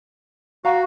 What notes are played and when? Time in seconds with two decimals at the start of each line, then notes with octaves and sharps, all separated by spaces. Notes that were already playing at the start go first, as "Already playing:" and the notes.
0.65 F#4 F5 A#5